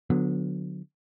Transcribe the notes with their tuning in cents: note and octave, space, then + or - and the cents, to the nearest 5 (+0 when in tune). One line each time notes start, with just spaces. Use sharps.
D3 +0 F#3 -30 B3 +0